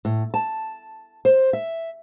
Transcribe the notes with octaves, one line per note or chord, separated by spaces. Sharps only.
A2
A5
C5
E5